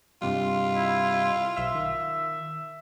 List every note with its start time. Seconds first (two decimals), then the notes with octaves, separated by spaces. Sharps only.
0.22 G2 C3 G3 F4
0.76 E4
1.57 B1 E5 C6 E6
1.75 D#3